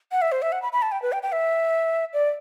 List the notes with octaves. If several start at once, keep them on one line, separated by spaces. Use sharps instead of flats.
F#5
E5
C5
E5
F#5
B5
B5
A5
G5
B4
G5
G5
E5
D5